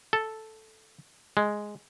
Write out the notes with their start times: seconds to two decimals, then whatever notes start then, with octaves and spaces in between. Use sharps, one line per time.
0.13 A4
1.37 G#3